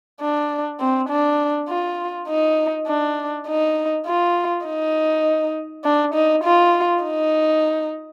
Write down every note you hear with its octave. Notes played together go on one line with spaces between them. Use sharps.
D4
C4
D4
F4
D#4
D4
D#4
F4
D#4
D4
D#4
F4
D#4